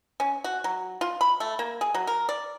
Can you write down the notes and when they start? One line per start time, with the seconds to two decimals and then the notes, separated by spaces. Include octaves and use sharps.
0.20 C#4
0.44 F#4
0.64 F#3
1.01 F4
1.21 B5
1.40 A3
1.59 A#3
1.81 G#4
1.94 F#3
2.07 A#4
2.29 D5